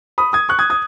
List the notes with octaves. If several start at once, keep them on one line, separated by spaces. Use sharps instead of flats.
B5 D#6
D#6 G#6
C#6 F#6
D#6 G#6
D#6 G#6